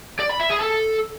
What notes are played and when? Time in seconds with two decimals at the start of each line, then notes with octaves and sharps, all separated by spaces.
0.20 D5
0.30 B5
0.41 E5
0.51 G#4
0.61 A4